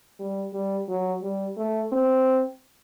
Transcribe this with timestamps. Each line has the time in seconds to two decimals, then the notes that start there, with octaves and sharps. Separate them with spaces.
0.20 G3
0.53 G3
0.89 F#3
1.23 G3
1.57 A3
1.92 C4